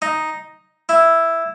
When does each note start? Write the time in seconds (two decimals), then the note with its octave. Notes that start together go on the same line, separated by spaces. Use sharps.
0.02 D#4
0.89 E4